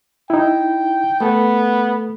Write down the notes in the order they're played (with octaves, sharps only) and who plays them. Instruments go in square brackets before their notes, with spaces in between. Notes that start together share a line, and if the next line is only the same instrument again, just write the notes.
[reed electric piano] D#4 E4 [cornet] G5
[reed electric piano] A3 A4 [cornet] B3